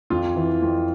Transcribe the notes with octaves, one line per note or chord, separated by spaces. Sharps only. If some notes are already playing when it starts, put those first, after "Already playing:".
F2 F4
E3
F2